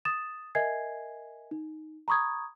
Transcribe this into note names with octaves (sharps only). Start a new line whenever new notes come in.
D#6 A6 E7
A#4 D#5 E5 G#5 G#6 C7
D#4
A#5 B5 C#6 D#6 G#6